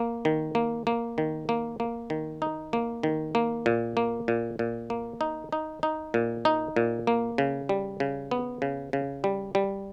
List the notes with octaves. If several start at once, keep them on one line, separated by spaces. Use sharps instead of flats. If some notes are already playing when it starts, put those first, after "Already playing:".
Already playing: A#3
D#3
A#3
A#3
D#3
A#3
A#3
D#3
D#4
A#3
D#3
A#3
A#2
A#3
A#2
A#2
A#3
D#4
D#4
D#4
A#2
D#4
A#2
A#3
C#3
G3
C#3
B3
C#3
C#3
G3
G3